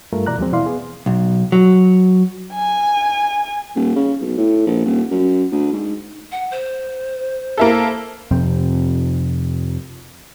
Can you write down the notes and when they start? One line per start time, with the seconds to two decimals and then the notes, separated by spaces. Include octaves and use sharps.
0.13 G2 G3 A3 F4 A#4
0.27 G#2 B2 E3 D5 A#5 F#6
0.38 D#2 F3 F#3 G#3 C4
0.52 B2 E3 E4 D5 F5 C6
0.66 B3 G#4
1.06 B1
1.52 F#3
2.54 G#5
3.76 D#1
3.96 C#3
4.21 B1
4.38 A2
4.67 A#1
4.85 D#1
5.11 F#2
5.52 D2
5.73 G#2
6.32 F#5
6.51 C5
7.58 A#3 E4 A4
8.31 F2 C3 C4